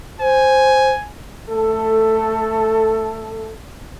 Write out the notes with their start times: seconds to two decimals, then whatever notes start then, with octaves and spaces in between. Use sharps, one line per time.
0.20 C5 G#5
1.49 A3 A4